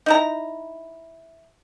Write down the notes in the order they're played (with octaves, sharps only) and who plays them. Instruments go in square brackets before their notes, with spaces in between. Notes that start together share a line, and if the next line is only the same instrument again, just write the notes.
[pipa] D#4 E4 A#5